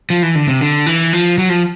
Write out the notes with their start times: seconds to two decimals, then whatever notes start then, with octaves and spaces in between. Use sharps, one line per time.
0.10 F3
0.23 E3
0.35 D3
0.48 C3
0.61 D3
0.86 E3
1.13 F3
1.38 F#3
1.49 F3